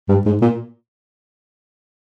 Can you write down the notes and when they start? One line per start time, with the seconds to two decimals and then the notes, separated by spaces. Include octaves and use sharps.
0.09 G2
0.26 G#2
0.42 A#2